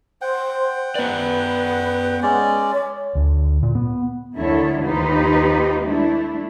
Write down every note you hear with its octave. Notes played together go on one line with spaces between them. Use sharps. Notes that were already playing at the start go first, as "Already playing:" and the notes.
C5 F#5 G5
B3 B4 D5
G#3 C#4 D5
C#5
D2
A#2
B3
D2 D3 D#3 E4 A4 C#5
D#2 D#4 F4 G4 B4 C5
A3 D4 E4